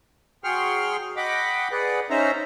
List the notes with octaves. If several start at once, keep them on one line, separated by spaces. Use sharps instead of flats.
F#3 G#4 G5 C6 C#6 F6
D#5 F#5 G5 B5 D6
G#4 B4 D5 F#5
C#4 D#4 C5 E5 A#5